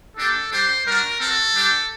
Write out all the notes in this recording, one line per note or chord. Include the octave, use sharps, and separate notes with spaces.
A#3 D4 G4 A4
G3 D4 G4 C5
G3 D4 F#4 A#4
C4 F#4 A4
G3 D4 G4